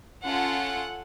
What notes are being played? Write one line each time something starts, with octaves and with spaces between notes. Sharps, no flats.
C#4 F4 A4 F#5